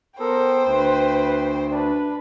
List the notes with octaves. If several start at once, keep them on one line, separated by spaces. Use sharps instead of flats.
B3 A4 A#4 C5 G5
D2 B4
D4 B4